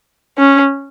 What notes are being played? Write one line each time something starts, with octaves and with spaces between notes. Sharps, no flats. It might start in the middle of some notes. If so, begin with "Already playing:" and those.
C#4